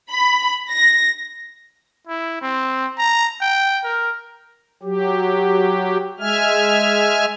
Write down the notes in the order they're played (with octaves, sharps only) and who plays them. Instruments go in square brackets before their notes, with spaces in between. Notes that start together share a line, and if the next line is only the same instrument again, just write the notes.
[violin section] B5
A#6
[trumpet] E4
C4
A#5
G5
A#4
[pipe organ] F#3 G4
G#3 E5 G#5 F6